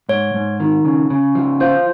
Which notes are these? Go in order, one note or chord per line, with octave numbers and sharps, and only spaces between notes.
G#2 C#5
G#2
D#3
C#3
C#3
F3
F4 C5